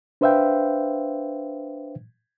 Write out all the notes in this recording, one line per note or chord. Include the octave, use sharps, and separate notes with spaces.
D4 B4 C5 E5 F5 G5